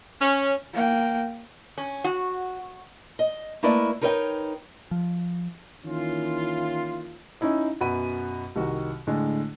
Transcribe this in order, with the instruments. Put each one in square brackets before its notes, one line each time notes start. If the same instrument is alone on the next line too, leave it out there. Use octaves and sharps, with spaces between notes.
[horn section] C#4
[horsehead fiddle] A#3 G5
[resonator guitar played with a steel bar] C#4
F#4
[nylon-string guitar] D#5
A3 A#3 E4 B4 D5 D#5
D#4 A#4 B4 C#5 D#5 G5
[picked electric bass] F3
[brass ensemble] D#3 E3 A#3 C#4 E4 F4
[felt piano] C#4 D#4 E4 D#5
F#2 B2 F#5 B5 D#7
C2 D#3 F#4
A2 D3 G#3